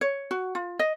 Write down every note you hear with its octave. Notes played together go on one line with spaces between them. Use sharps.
C#5
F#4
F4
D#5